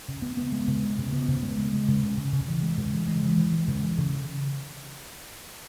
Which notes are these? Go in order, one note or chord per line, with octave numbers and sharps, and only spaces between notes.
C#3
B3
B3
G#3
C#3
B3
C#3
B3
C#3
G#3
G#3
G#3
C#3
C#3
C#3
C#3
E3
G#3
C#3
E3
G#3
E3
E3
G#3
C#3
E3
C#3